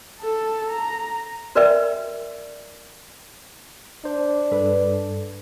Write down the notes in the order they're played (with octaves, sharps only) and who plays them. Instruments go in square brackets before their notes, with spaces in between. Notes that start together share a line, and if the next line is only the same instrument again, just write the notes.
[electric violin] A4 A5
A#5
[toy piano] F#4 A#4 B4 D5 E5 G5
[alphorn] D4 [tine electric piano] C5
[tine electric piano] G2 A4 [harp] B4